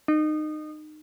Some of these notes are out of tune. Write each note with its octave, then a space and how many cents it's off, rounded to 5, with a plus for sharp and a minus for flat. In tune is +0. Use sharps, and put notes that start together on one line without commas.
D#4 -25